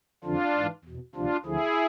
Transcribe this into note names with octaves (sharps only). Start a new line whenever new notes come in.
F2 D3 F3 D4 F4
G#2 E3
E2 B2
D2 C3 F3 D4 F4
D2 D3 F3 E4 G#4